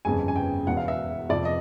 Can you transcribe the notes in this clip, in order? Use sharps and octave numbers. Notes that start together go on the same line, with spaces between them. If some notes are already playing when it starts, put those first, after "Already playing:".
G1 F2 C#3 G#5
G#5
G5
E1 E2 B2 F#5
F5
E5
F2 C3 F3 D5
D#5